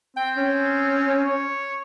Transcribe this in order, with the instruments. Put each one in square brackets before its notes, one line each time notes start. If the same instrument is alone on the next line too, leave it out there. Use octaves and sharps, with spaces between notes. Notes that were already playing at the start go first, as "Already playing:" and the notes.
[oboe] C4 [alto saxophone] G5
[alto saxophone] C#4
[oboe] C#5